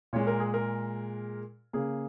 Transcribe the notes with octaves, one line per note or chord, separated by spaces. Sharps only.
A#2 G#3 C#5
A#4
G#4
A#4
C#3 A#3 G#4